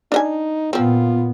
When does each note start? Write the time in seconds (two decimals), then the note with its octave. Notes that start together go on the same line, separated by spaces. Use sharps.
0.12 D4 D#4 D#5 G#5
0.73 A#2 F3 B3 C4 F4